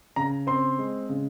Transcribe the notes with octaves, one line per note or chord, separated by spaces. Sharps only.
C#3 A#5
C4 C6
G#3
C#3